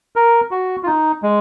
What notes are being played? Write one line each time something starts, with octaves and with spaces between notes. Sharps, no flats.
A#4
F#4
F4
D#4
G#3